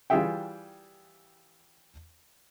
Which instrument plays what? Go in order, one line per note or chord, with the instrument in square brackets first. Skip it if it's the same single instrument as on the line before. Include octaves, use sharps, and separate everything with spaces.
[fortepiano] E3 G3 F4 G#4 E5 G5